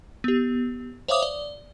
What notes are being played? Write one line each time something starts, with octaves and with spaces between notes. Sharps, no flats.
B3 G4
C5 C#5 E5 F5 D6 D#6
D5